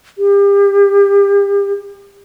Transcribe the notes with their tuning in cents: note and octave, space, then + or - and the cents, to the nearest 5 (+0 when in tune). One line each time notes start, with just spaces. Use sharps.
G4 +35